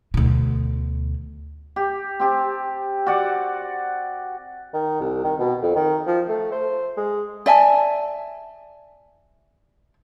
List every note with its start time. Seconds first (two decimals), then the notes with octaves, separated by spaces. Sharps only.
0.14 D2 B2
1.76 G4
2.20 C4 G4 A5
3.06 F#4 D5 F#5
4.74 D#3
5.01 C2
5.24 D#3
5.39 B2
5.62 F2
5.75 D#3
6.07 F3
6.28 A3
6.52 C5
6.97 G#3
7.46 D5 E5 G#5 A5